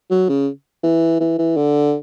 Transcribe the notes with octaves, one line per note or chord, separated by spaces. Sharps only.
F#3
C#3
E3
E3
E3
D3